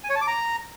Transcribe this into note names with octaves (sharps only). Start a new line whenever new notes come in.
G#5
C#5
A5
D6
A#5